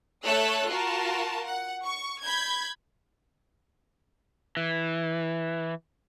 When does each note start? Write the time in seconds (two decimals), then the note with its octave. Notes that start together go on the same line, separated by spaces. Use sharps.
0.25 A3 A4 C#5 E6 F#6
0.69 F4 F#4 A#4 A5
1.46 F#5
1.84 C#6
2.23 B5 G6 G#6
4.57 E3